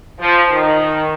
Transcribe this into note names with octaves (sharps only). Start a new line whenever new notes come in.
F3
D#3